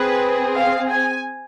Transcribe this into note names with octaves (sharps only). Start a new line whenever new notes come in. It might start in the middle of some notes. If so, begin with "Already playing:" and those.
Already playing: C4 G#4 B4
F5
G#5